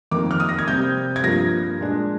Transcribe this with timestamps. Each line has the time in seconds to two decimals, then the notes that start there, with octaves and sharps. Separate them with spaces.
0.11 F2 D#3 A#3 D6
0.31 F6
0.40 D#6
0.49 A#6
0.59 G#6
0.67 C3 G3 C4 G6
1.16 G#6
1.23 G2 F3 A#3 A#6
1.80 A#2 G#3 D4